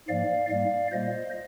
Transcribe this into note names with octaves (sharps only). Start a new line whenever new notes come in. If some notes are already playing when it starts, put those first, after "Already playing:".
G#2 F3 A#3 D5 F5
G#2 G3 A#3 D5 F5
A#2 G3 A#3 C5 D#5